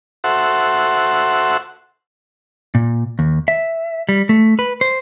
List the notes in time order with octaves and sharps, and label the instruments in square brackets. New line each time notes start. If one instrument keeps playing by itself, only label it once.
[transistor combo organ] F#4 A4 C5 E5 F#5
[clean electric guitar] A#2
D#2
E5
G3
A3
B4
C5